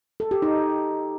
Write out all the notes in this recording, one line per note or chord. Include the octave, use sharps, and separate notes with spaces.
A4
G4
D#4